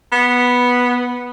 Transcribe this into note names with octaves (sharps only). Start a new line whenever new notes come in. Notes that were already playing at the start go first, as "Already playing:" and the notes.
B3